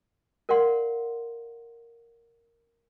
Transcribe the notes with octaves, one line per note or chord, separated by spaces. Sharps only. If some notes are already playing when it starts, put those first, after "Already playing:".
A#4 D5 F5 F#5 C6